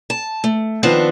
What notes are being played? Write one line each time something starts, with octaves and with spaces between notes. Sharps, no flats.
A5
A3
D#3 F3 B3 C4 D4